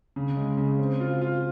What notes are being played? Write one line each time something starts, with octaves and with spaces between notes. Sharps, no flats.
C#3
G#3
C#3
C4
F4
F4